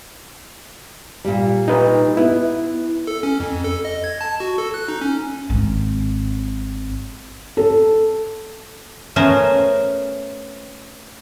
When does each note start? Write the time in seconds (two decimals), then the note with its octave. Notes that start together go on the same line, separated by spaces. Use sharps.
1.25 A#2 G3
1.68 D#4 B4
2.17 B3 E4
3.07 A4
3.23 C#4
3.40 F2
3.64 A4
3.85 D#5
4.04 G#6
4.21 A5
4.40 F#4
4.58 A4
4.74 F#6
4.88 D#4
5.01 C#4
5.50 G#1 C4
7.57 A4
9.16 A3 B3 C#4 A#4 C5